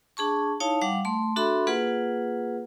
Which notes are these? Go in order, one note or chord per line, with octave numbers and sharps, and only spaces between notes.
D4 G#4 A5 C#6
D#4 E4 C#5 F5 A5
G3 F5 F#5 D6
A3 C6
D4 F#4 A4 E5 B5 C6
A#3 F4 G#4 B4 F#5